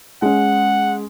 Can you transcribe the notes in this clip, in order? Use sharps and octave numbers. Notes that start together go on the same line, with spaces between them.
G#3 C#4 F#5